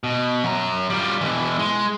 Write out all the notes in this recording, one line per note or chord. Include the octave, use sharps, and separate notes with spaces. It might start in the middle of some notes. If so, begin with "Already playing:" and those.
B2
F#2 A#5
G3 F4
B2 E3
G#3